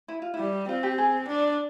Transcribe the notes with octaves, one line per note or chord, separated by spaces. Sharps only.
E4
F4
E4
G3
C4 F4
G4
G#4
D4